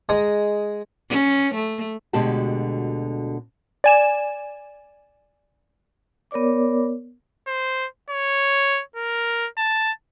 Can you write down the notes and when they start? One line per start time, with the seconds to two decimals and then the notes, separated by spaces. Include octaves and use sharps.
0.09 G#3 D#5 A#5
1.10 C#4
1.55 A3
2.13 D2 B2 D3 G#3 G4 A5
3.84 D5 G#5 E7
6.31 B3 A#4 C#5 D5 D6
7.47 C5
8.10 C#5
8.96 A#4
9.57 A5